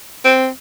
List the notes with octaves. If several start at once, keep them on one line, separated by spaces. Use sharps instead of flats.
C4